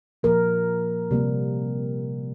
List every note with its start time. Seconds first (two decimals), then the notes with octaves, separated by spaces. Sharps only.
0.23 A#2 F3 A#3 A#4
1.11 C3 G3 A#3